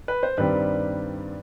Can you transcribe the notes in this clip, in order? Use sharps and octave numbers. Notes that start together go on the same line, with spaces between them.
B4
C5
G2 D#3 G3 C4 B4